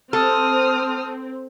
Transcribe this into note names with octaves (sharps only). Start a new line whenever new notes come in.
C4 A4 D#6 F6